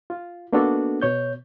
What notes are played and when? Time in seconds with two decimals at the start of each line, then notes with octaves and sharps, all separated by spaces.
0.10 F4
0.53 A#3 B3 D4 D#4 F#4 A4
1.02 B2 C#5 G6